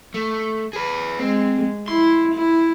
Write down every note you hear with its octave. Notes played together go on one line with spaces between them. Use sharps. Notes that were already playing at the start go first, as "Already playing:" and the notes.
A3
G#4 B4
G#3 C4
E4 C6
E4